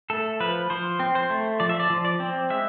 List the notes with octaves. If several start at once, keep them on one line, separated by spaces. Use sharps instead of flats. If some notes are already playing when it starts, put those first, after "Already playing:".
A3 A4
F3 B4
F3 C5
C4
C5
A3
F3 D5
E5
D5
F3
D5
C4
G#3 E5